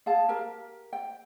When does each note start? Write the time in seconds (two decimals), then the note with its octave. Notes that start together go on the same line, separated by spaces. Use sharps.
0.06 G#4 F5 A5
0.29 G4 A#4
0.93 G5